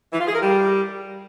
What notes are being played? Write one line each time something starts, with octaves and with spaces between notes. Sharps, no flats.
E3
F4
G#4
A#4
G3